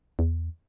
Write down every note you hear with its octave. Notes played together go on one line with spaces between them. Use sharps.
E2